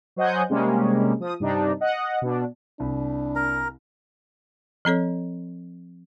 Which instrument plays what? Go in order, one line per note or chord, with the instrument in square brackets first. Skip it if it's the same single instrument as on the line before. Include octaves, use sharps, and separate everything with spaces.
[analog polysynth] F#3 C5 D#5 F#5 G#5 G6
C3 G3 G#3 A#3 C#4
F3 D#6
G2 C3 D4 D#4
D#5 F#5
B2 D4
[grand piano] C2 [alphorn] D4
[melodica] A#4 A#5
[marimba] F3 C4 A4 C#5